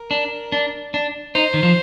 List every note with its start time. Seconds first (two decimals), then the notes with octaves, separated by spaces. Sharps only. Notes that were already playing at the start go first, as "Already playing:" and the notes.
Already playing: A#4
0.11 D4
0.52 D4
0.94 D4
1.35 D#4 C5
1.54 D#3
1.63 F3